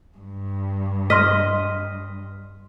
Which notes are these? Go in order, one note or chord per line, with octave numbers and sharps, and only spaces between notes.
G2
D#5 C6 F6 B6